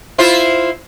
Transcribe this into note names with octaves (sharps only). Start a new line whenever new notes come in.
E4 F4 C5